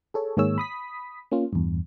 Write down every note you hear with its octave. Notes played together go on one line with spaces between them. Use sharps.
G#4 A4 C#5
G#2 D#3 A#3 G#4 C#5 E6
B5 D#6 B6
A#3 C#4 F4
E2 G2